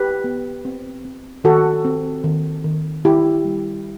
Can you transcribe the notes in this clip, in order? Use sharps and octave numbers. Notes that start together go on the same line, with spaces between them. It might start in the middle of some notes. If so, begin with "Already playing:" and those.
Already playing: G4 B4
B3
C4
C4
D#3 F#4 A4
C4
D#3
D#3
D#3 E4 G4
G3